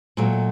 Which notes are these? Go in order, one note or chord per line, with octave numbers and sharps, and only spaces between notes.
A#2 F#3 A3